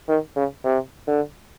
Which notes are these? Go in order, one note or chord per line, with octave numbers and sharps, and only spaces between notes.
D#3
C#3
C3
D3